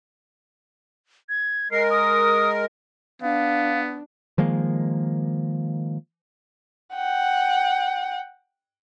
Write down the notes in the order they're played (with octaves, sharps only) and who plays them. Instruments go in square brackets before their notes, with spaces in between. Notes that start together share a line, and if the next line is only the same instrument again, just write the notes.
[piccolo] G#6
[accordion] G#3 A#4 [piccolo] C7
[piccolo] D#6
[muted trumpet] B3 [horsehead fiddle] D4 [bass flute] F5
[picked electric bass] D#3 F3 G#3 A#3
[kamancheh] F#5 G5